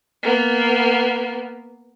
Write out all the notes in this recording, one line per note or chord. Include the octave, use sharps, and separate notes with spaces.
A#3 B3